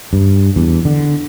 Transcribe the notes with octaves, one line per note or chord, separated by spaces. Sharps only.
G2
E2
D3